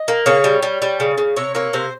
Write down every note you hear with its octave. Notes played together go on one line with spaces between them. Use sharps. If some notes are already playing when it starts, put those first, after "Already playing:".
Already playing: D#5
A#3
C#3 C#5
G3
G3
G3
C#3
C#3
C3 C#5
A#3 C#5
C3 C5